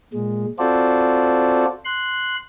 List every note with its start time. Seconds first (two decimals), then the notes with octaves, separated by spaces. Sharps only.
0.13 A#2 G#3
0.59 C4 F4 F#4 A4 C5 D5
1.85 C6 F#6